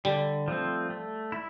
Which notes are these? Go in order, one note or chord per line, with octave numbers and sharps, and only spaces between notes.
D3 G3
F3 A3 C4
A3
E4